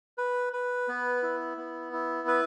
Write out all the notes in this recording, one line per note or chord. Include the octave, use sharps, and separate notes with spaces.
B4
B4
B3
E4
B3
E4
B4